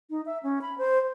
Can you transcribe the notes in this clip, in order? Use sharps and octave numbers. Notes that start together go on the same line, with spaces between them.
D#4
E5
C#4
B5
C5